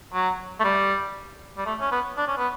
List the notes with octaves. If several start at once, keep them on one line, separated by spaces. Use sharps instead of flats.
F#3
A3
G3
G3
A3
C#4
B3
D4
C#4
B3